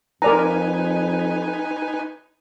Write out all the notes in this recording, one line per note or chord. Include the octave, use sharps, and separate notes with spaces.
F2 D#4 A#4 B4 D5 G#5 A#5